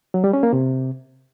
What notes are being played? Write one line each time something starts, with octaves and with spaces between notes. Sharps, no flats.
F#3
G3
C#4
A#3
C3